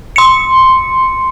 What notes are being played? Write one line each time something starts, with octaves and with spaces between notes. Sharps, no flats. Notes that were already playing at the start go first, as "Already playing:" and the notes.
C6 C#7